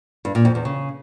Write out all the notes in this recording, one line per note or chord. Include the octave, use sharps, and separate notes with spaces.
G2
A#2
F2
E2
C#3